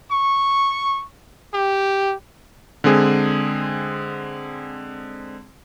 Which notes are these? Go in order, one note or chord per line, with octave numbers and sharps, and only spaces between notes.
C#6
G4
D3 G#3 C4 G#4